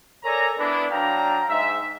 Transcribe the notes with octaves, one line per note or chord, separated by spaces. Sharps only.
A4 A#4 C#5 D5 G#5 A#5
B3 D4 E4
F#3 D4 F5 G5 A#5
G#2 E5